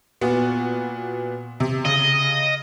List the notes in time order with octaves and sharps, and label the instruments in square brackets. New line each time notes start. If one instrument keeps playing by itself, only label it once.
[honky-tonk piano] A#2 B3 F#4
C3
[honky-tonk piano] C#3 [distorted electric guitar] D#5